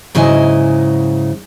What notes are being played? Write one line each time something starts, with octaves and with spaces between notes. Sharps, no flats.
G#2 C#3 F#3 E4 D#5 G#5